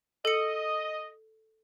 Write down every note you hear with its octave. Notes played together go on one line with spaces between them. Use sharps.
A4 D#5 C#7